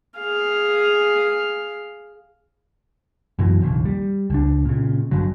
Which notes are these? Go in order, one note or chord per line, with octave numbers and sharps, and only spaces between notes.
G#4 F5
F#2 B2 E3 F#3
F1 A#1 D#2
G3
C#2 D4
A#2 C#3
G1 G2 D3 F#3